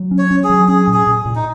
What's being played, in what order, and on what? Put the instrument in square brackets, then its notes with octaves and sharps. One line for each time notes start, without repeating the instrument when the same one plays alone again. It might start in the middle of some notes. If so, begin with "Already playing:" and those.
Already playing: [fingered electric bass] F#3
C#4
[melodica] C#5
[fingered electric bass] C#4
[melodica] G#4
[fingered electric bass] F#3
[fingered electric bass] C#4 [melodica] G#4
[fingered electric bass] A#2
[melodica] G#4
[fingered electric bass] A#2
A#2
[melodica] D#4